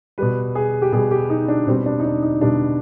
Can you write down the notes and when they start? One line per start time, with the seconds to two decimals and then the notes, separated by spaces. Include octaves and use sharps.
0.18 B2 G3 B4
0.55 G#4
0.82 G4
0.92 B2 G3 G#4
1.11 G4
1.30 D#4
1.48 D4
1.67 B2 G3 C4
1.86 D4
2.00 D#4
2.05 D4
2.23 D#4
2.41 B2 G3 D4